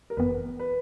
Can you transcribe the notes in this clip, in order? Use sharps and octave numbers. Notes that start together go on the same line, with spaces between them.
A#4
G1 F#2 E3 B3 B4
B4